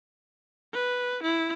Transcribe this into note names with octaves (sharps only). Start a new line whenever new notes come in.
B4
E4